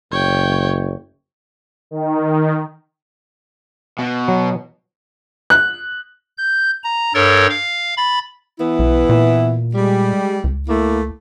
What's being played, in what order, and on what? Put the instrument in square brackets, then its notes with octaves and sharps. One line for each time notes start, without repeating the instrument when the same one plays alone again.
[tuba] F#1 [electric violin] C#5 G5
[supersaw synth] D#3
[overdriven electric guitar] B2
[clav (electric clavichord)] F#3
[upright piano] F#6
[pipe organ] G6
A#5
G2 A4 A#4 C#5 A6
F5
B5 A6
[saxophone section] E3 B3 E4
[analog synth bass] B1
A#2
[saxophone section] G3 G#3
[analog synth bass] C#2
[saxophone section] A3 A#3 E4